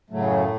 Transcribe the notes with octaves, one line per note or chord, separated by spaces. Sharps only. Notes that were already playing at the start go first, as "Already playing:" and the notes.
F#2 A2 C#3 F#3 A3